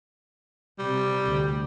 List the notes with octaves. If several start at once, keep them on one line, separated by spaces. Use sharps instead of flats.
C3 G3 C4
D2